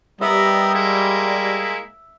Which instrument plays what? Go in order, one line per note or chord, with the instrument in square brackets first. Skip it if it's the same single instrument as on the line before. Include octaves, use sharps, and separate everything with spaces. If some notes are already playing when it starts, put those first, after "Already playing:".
[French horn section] G3 [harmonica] B3 A#4 D#5 [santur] E5
[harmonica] G#3 A#3 E4